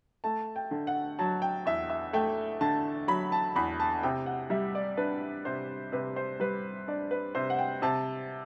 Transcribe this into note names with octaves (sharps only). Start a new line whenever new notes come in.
A3 A5
G5
D3
F#5
F#3 A5
G5
E2 E5
E5
A3 G5
D3 A5
F#3 B5
A5
E2 B5
A5
C3 G5
F#5
G3 E5
D5
D4 B4
C3 C5
C3 B4
C5
G3 B4
D4 D5
B4
C3 C5
F#5
G5
C3 A5